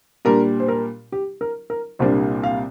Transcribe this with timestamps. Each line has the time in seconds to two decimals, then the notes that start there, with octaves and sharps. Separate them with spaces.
0.25 A#2 G3 D4 A#4
0.60 C5
0.68 A#4
1.12 G4
1.41 A#4
1.70 A#4
1.99 C2 A#2 G3 A#3 D4 C5
2.44 F5